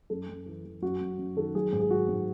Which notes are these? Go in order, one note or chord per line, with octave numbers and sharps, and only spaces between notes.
F#2 A4
F#2
E3
E3
F#2 F#4
F#2
F#2
D#3 A4
F#3 G#4
G#2
G#4
F#3 F#4
G#2